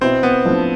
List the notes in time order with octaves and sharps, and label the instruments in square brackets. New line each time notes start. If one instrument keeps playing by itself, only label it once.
[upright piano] B2 B3 E4 [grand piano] C4
[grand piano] B3
[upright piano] A2 F3 A3 D4